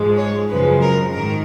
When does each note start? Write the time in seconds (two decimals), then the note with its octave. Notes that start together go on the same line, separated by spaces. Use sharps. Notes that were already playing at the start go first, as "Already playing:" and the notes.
Already playing: G#2 F3 G#3
0.17 C#5
0.49 F#2 C#3 F3 G#3 B4
0.81 A#4
1.13 G#2 D#3 A#4